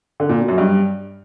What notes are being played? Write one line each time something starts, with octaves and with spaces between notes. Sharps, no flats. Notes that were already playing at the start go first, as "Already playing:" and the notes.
D3
A#2
B2
F#2
G2